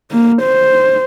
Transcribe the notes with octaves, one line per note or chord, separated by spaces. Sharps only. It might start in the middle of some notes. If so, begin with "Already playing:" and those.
A#3
C5